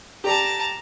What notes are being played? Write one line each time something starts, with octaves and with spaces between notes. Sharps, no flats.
G4 D5 A5 A#5